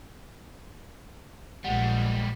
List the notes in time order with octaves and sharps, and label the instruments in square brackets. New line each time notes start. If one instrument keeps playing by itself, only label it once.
[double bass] A#1 [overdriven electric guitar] G3 G#3 [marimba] F#5